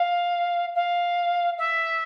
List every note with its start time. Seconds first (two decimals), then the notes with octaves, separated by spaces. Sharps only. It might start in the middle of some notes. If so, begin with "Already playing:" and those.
Already playing: F5
0.75 F5
1.58 E5